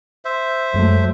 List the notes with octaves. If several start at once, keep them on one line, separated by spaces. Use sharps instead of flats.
C5 E5
F#2 F#3 G#3 A3